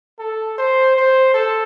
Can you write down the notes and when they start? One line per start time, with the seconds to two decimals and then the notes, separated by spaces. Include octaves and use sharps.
0.19 A4
0.58 C5
0.96 C5
1.34 A4